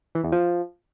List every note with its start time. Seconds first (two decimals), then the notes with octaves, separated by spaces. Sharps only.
0.15 E3
0.24 E2
0.32 F3